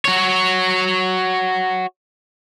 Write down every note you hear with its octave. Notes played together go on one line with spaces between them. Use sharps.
F#4 C#5